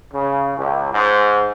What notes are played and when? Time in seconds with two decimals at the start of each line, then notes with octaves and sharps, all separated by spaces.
0.14 C#3
0.58 C#2
0.93 G#2